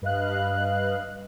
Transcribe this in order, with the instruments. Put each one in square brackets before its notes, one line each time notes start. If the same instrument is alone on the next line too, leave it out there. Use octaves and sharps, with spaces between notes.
[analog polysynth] G2 B4 D#5 F5 F#6